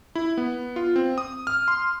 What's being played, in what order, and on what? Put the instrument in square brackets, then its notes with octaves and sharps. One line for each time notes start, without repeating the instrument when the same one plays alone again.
[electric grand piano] E4
B3
F4
C4
D#6
F6
C6